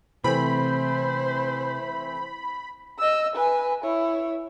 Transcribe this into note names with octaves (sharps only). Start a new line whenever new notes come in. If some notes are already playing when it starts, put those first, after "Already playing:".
C3 E3 A3 C4 C5 B5
D#5 E6
B4 G#5
E4 C#5